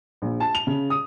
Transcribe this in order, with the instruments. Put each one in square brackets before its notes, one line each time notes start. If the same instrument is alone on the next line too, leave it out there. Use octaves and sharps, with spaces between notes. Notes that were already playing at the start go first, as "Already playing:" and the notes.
[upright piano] A#1
A5
F7
C#3
D#6